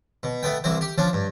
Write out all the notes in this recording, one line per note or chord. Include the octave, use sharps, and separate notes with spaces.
B2
A3 B3 G5
C2 E3 C4 C5
G4
F3 C#4 D4
G2